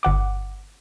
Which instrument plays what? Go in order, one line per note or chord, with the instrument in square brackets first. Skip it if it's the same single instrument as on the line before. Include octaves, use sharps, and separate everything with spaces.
[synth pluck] G1 F#5 D6